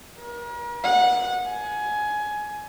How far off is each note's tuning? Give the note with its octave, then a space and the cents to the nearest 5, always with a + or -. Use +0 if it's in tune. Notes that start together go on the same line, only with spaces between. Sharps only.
A#4 +40
F#5 -20
G#5 +20